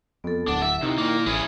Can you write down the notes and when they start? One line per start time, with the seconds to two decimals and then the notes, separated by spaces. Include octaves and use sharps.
0.24 F2 B3 A4
0.48 D1 D4 F#5
0.62 E5
0.82 C3 D#3 E4
0.98 A#2 A#3
1.26 A1 C#4 E4 G#4